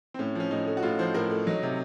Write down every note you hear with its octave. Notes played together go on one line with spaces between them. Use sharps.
C4
A2 C#4
F3 C#4
A2 D#4
A3
F#4
A2 F4
F3 C5
A2 A#4
A3
F#3 D#4
C3